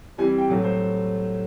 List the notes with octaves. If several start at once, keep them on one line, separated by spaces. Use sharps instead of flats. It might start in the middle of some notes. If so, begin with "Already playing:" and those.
E3 G3 C4 G#5
G5
A2 F#3 A3
C5